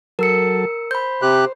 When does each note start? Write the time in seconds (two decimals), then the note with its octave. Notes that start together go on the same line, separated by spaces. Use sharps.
0.19 F#3 A4 A#4 E6 C#7
0.91 C5 B5 G6
1.22 C3 G4 F#6